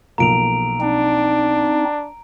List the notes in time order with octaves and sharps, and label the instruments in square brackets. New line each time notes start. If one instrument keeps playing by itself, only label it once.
[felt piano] B1 F3 A#3 [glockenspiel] A#5 D7 F7
[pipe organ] C4 D#4 [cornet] D4